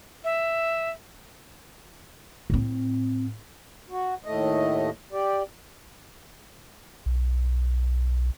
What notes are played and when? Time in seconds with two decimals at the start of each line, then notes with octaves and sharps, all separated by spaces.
0.24 E5
2.50 A2 C4
3.90 F#4
4.25 D#2 A2 A3 D#5
5.12 G4 D5
7.06 B1